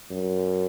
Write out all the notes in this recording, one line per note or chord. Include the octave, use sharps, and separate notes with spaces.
F#2